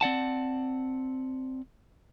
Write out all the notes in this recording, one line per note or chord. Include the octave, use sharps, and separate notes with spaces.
C4 D5 F#5 A5